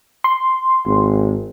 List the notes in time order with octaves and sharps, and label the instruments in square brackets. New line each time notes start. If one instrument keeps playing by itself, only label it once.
[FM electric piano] C6
[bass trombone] G#1